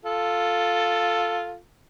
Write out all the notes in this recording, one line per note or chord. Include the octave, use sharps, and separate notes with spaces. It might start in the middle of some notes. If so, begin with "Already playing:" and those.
F4 A4